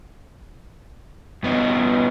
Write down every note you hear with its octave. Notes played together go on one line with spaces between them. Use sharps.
G2 B3 D#4